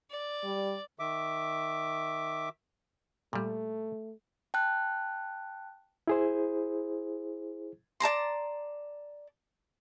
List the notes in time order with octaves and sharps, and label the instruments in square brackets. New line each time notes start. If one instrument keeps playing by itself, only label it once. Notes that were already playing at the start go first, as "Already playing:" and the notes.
[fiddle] D5
[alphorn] G3
[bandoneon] D#3 E5 D6
[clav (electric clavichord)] A#2 G3 [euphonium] A3
[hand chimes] G5 A5 F#6
[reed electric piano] E4 G#4 C5
[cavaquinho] D5 A5 A#5 C6